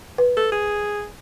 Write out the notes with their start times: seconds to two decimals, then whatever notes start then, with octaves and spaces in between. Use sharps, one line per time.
0.18 B4
0.37 A4
0.52 G#4